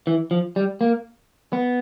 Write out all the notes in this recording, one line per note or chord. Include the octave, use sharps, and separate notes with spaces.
E3
F3
G3
A#3
B3